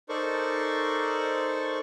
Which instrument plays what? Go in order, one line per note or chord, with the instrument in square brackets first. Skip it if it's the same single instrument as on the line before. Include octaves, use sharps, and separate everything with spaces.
[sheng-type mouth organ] D#4 A4 A#4 C5 D5 C#6